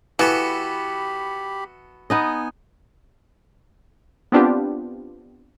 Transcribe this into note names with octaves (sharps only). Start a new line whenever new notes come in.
E3 B3 F#4 G4 A4 B5
B3 D#4 D#5 G#5
B3 C4 D4 F4 G4